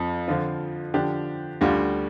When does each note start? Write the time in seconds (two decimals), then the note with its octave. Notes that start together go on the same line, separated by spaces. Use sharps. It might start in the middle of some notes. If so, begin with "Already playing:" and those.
Already playing: F2 F3
0.27 D3 F3 C4 F4
0.94 D3 F3 D4 G4
1.61 D2 D3 G3 F4